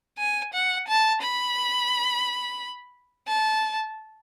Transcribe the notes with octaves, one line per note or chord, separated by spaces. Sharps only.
G#5
F#5
A5
B5
A5